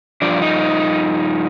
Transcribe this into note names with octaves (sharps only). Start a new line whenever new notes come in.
G2 F3 D4
D#4